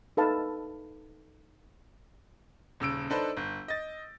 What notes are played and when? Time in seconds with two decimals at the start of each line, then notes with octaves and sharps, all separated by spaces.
0.17 D#4 A4 B4 F5 A5
2.80 D#1 C#3 E6 D7
3.10 D4 D#4 A4 B4 C5
3.37 G1 G6
3.68 D#5 A6